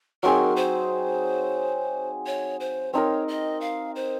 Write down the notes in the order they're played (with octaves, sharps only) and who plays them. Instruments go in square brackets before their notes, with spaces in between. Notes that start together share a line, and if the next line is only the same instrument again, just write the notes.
[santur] F#3 C4 D#4 G#4 [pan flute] A#4
[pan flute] C5
C#5
C5
[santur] C4 D#4 A#4 [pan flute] C#5
[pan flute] D#5
F5
C5